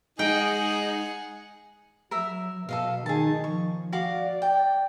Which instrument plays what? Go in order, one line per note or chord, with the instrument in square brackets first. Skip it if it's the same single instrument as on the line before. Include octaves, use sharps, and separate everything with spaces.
[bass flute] G#3 [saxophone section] D#4 [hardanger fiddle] G#4 F#5 [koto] G5
[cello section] F#3 [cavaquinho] A#4 E5
[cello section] B2 [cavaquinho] A4 D#5 F5
[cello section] D#3 D#4 [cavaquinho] G#4 A5
[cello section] F3 [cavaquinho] C#6
[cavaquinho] F#4 F5 D6 [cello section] D5
[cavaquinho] G5